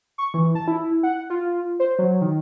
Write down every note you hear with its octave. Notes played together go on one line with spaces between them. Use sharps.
C#6
E3
A5
E4
F#5
F4
C5
F#3
D#3